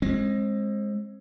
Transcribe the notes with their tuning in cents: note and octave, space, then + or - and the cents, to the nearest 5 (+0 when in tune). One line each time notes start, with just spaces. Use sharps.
G#3 +0 C4 +30